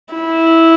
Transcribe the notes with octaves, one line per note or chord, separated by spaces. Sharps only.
E4